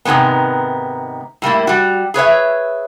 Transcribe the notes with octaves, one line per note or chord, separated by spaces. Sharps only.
G#2 C3 D#3 G#3 B3
A2 G3 A#3 E4
G3 F#4
G#4 B4 C#5 E5